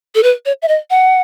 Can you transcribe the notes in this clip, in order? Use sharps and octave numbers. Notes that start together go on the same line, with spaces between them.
A4
B4
C#5
E5
D#5
F#5